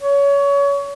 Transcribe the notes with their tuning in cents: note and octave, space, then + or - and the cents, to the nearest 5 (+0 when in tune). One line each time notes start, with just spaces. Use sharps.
C#5 +25